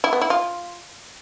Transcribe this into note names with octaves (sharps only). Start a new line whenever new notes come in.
E4
B3
E4
F4